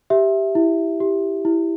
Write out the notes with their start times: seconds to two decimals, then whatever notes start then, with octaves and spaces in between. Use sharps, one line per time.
0.10 G4 E5
0.55 E4
1.00 G4
1.45 E4